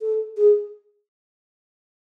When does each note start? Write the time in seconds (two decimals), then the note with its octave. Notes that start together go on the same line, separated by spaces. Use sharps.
0.01 A4
0.37 G#4